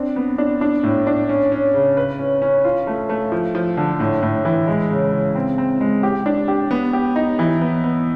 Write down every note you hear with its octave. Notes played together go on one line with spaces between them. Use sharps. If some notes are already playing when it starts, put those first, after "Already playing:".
Already playing: C4 D4
B3
D4
D4
A2
D4
C#4
C#4
C#3
B4
C#4
C#4
F4
A3
A3
F3
F3
D3
A2
A2
E3
G#3
C#3
C#3
C4
C4
G#3
G4
D4
G4
B3
G4
D#4
E3
B3
B3